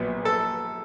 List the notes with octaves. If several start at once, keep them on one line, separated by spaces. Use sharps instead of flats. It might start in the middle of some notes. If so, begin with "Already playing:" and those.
Already playing: A#1 A#2 F#3 B3
A4